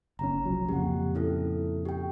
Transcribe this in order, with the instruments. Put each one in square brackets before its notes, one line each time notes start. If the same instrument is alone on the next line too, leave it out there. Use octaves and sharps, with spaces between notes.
[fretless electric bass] F#1 C#3 C#4 [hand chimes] A#5
[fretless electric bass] C2 F3 F#3
[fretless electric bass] F2 A#2 C#3 [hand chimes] G4 F#5
[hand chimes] C#4 E4 A4
G4 G5